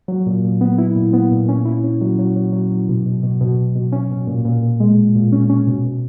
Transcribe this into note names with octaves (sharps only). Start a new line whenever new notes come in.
F#3
A#2
A#2
B3
E4
A#2
B3
A#2
C#4
E4
C#4
F#3
F#3
F#3
F#3
F#3
B2
B2
B2
B2
B2
B2
C#4
B2
A#2
A#2
A#2
G#3
A#2
A#2
C#4
C#4
B2
B2